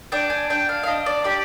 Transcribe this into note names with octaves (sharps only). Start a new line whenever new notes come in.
D4 G5
G#5
D4 G5
F5
F5
D4 D#5
D5
G4 D5